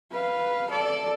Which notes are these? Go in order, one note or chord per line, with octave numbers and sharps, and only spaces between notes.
B4 F5
A4 D5